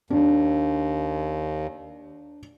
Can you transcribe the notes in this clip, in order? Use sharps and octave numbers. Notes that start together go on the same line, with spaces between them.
D#2 D4